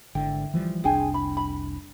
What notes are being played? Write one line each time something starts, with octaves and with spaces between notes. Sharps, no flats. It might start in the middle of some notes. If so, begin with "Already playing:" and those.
G#1 D3 E4 G5
E3 F3 G3
F1 C2 D4 G#4 G5 G#5
B5
B5